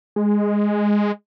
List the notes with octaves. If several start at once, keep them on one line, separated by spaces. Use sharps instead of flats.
G#3